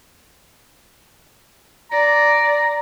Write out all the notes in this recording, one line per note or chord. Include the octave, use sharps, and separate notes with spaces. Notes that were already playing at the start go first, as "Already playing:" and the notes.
D5 A#5